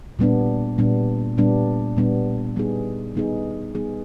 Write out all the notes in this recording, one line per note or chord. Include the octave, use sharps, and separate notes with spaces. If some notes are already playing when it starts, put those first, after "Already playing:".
A#2 G3 B3 D4
A#2 G3 B3 D4
A#2 G3 B3 D4
A#2 G3 B3 D4
G3 B3 D#4 G#4
G3 B3 D#4 G#4
G3 B3 D#4 G#4